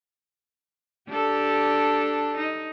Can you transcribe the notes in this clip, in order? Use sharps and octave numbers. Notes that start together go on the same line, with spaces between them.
D4 G4 A4
D#4